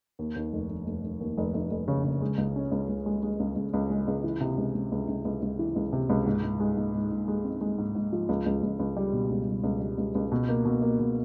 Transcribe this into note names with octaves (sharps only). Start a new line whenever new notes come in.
D#2
D#2
F1
F1
F1
F1
D#2
F1
F1
F1
C#3
C#3
G#3
C#2
C#4
C#2
C#2
G#3
G#3
C#2
C#2
C#2
G#3
C#2
E3
C3
C#2
C#2
C#2
C#2
C#2
C#2
E3
C#2
C3
C#2
G#2
G#2
G#3
G#2
G#2
G#2
G#3
C4
G#3
G#2
G#2
F3
C#2
C#2
C#2
C#2
G3
B2
C#2
G3
C#2
G3
C#2
C#2
B2
A#3
B2
A#3
B2